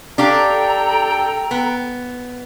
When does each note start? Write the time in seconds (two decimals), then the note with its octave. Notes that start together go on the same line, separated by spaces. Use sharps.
0.18 D4 G4 A4 F5 G5 A#5
1.51 B3